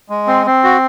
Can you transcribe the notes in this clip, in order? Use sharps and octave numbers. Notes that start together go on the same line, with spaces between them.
G#3
C4
C4
F#4